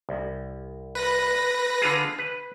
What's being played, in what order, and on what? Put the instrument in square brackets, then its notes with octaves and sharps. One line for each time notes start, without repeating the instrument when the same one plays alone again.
[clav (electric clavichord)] C2
[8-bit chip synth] B4 A#6
[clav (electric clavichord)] D3 F4 G#4
B4